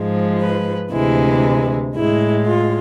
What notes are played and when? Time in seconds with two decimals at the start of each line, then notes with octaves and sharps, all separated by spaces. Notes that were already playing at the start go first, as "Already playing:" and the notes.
Already playing: G#2 F3 G#3
0.41 B4
0.92 D2 C3 E3 G#3 E4
1.95 A2 G#3 E4
2.46 F4